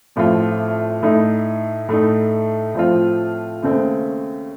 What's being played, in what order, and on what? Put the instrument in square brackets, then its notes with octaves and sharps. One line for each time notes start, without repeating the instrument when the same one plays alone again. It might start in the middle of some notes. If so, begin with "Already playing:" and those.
[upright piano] A1 A2 F3 C4 F4
A2 A3 D#4
A2 A3 D#4
A2 F3 C4 F4
D#2 C#3 A3 C4